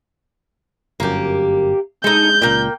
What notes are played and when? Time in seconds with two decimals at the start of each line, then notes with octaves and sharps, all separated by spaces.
1.00 G1 F#2 A#3 G4
2.04 G#3 D#4 A4 G6
2.42 C#2 A#2 A#3 G5